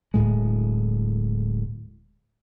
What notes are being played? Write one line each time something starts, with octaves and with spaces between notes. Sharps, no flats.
D1 G#1 A2 G#3